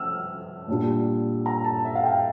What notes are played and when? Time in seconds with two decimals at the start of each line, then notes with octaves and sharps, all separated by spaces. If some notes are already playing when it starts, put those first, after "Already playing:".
Already playing: F3 A3 E6 F6
0.68 A#2 G3 D4 F4
1.46 A#5
1.64 A5
1.85 E5
1.95 F5
2.04 G5